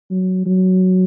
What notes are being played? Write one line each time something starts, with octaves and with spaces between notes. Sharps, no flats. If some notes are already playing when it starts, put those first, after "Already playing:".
F#3
F#3